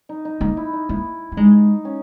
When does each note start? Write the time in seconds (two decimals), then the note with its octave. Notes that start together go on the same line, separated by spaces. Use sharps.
0.09 D#4
0.25 D#4
0.41 A#3 D#4
0.57 E4
0.73 D#4
0.89 A#3 E4
1.32 A#3
1.37 G#3 D#4
1.85 C#4